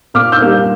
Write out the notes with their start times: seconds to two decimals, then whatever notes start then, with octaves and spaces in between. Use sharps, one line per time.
0.14 A#2 D6 F6
0.32 E6 G6
0.41 G3 A#3